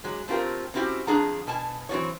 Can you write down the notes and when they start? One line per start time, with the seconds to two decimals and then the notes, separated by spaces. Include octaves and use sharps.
0.04 F#3 G#3
0.28 A3 C4 F4 G4 A#4
0.74 C4 C#4 E4 F#4 G4
1.07 F2 D4 G#4 F#5 A#5
1.47 B2 G#5 A5
1.89 E3 F#3 C4 F4 F#4 C#5